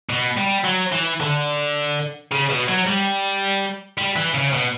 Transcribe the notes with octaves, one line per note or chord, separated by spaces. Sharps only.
B2
G3
F#3
E3
D3
C#3
B2
F#3
G3
G3
E3
C#3
B2